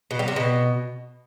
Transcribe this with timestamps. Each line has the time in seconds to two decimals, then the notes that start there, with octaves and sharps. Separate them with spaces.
0.11 B2
0.19 G3
0.28 C3
0.36 B2